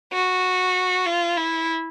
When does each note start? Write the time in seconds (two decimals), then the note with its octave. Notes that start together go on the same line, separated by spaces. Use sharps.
0.13 F#4
1.06 F4
1.37 E4